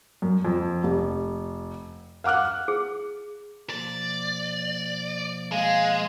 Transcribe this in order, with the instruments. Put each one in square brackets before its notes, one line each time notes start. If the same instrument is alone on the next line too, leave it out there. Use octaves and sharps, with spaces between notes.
[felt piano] F#2
F2
F1
F5 F#5 D6 F6 F#6
[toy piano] G#4
[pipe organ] B2 F3 A#3 [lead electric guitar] D5
[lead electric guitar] G#3 [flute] F5